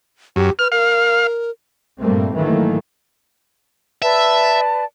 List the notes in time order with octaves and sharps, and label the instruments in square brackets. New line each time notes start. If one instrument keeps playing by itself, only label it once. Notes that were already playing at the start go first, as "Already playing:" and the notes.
[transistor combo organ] F#2 [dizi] G4
[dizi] B4 [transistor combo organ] F6
[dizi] A#4 [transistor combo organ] F5
[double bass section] G2 A#2 G3 A3 A#3 C4
G#2 D#3 E3 F#3 A3 A#3
[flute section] B4 D5 A5 [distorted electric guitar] E5